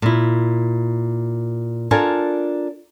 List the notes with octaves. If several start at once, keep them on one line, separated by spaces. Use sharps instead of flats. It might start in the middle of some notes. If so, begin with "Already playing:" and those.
A#2 E4
D4 F4 A4 A#4 G#5